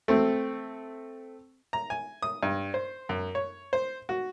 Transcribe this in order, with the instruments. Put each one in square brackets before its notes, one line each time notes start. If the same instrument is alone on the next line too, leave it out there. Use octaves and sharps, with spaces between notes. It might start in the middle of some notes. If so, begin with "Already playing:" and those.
[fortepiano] A3 C4
A#5
G#5
D#6
G2
C5
F#2
C#5
C5
F#4